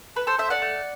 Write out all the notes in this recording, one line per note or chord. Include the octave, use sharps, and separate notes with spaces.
A4 B4
A4 C5
A4 C5 E5
D5 F#5
A3